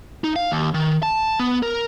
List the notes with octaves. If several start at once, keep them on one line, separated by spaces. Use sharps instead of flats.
D#4
F5
D#2
D#3
A5
B3
A#4